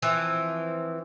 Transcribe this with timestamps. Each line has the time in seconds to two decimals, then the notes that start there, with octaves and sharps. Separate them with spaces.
0.02 E3 F3 C4